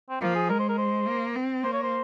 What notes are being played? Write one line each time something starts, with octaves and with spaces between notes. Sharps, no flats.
C4
F3 A#3
G#4
G#3 A#4
C5
A#4
C5
A#3
C4
A#3 C5
C#5
C5